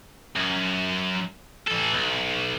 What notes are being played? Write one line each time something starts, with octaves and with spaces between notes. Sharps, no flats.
F#2
E3 A4
B1